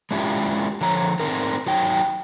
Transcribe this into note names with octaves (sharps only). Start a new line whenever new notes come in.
G#3 C#4 D4 E4 F4 G4
D3 F3 C#5 A#5
A3 C4 D4 D#4 A#4
F#3 D#4 G5